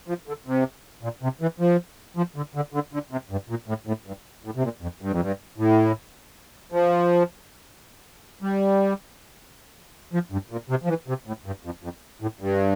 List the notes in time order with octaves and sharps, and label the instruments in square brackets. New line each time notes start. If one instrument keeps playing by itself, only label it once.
[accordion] F3
D3
C3
A#2
C3
E3
F3
F3
D3
D3
D3
D3
C3
G2
A#2
A2
A2
G2
A2
C3
A#2
F2
G2
F2
G2
A2
F3
G3
F3
G2
A#2
C3
F3
E3
C3
A2
G2
F2
F2
A2
G2